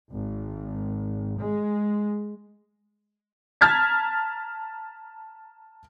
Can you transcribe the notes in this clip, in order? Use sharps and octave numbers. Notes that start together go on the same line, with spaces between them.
G#1
G#3
A5 A#5 F6 G#6 A6 B6